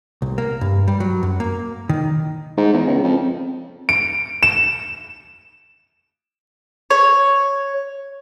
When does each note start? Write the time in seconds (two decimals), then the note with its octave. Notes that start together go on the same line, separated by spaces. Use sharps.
0.22 C2
0.38 A#3
0.61 G2
0.88 G3
1.00 F#3
1.23 F#2
1.40 A#3
1.89 D#3
2.57 G#2
2.73 E2
2.87 C#2
3.03 F2
3.89 D7
4.43 E7
6.90 C#5